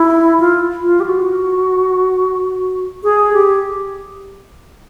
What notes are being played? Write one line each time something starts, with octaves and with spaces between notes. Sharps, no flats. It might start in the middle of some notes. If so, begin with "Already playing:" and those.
Already playing: E4
F4
F4
G4
F#4
G#4
G4